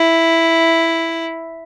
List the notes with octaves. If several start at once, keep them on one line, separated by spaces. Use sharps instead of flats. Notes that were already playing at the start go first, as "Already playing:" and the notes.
Already playing: E4